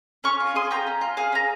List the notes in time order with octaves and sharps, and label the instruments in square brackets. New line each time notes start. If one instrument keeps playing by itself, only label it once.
[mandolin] C#4 C#6 F6
F4
G#4 C6 D#6
C#4 G5 A#5
C#4
F4
G#4 F5 G#5
C#4 A#5